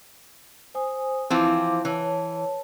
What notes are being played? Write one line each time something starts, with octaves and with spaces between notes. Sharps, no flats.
C5 G#5 D#6
E3 F3 C4 E4 F5 D6
E3 C#5 A5